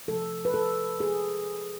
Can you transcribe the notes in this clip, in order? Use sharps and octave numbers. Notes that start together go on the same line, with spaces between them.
C3 F3 A3 A4
B4
A4
G#4